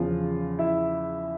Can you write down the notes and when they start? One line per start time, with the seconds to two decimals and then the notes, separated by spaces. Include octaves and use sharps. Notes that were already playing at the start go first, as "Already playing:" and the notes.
Already playing: E2 C#3 F3 F4
0.59 E4 E5